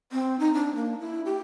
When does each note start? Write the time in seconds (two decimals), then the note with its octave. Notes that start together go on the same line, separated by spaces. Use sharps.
0.12 C4
0.39 D#4
0.54 D4
0.75 A#3
0.99 E4
1.25 G4